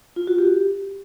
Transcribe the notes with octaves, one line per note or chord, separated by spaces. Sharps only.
F4
F#4
G4